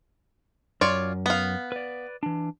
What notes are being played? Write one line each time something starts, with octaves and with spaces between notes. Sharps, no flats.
F#2 F4 C#5 D5
B3 F5
B4 D5
E3 D4